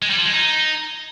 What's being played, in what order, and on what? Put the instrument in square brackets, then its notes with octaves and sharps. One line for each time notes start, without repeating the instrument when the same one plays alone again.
[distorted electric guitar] G#3
G3
F3
G#3
D#4